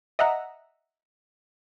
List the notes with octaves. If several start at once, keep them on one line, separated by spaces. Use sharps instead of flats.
D#5 E5 F#5 A#5